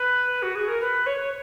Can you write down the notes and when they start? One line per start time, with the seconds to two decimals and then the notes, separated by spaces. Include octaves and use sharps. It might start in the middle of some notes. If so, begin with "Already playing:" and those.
Already playing: B4
0.43 F#4
0.55 G#4
0.68 A#4
0.81 B4
1.06 C#5